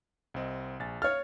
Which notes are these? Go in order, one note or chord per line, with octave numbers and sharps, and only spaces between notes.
C2 C4 D#5
A#1 G#5 A6
C#5 F5 F6 A6